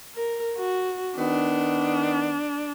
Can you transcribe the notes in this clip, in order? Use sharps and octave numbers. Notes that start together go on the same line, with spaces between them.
A#4
F#4
D#3 B3 D4